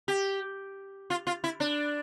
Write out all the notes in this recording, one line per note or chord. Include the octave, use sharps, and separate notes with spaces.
G4
F4
F4
E4
D4